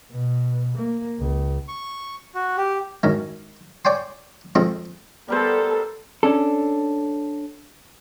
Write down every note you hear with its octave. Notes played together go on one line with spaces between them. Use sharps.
B2
A#3
C#2
C#6
F#4
G4
F#2 D#3 G#3
C#5 D5 G5 G#5 C6
F3 G#3 C4 G#4 A4
G3 B3 A4 A#4 C5
C#4 D4 A4